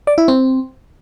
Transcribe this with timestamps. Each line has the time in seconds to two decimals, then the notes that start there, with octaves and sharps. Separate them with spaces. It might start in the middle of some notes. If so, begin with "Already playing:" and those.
0.07 D5
0.18 E4
0.28 C4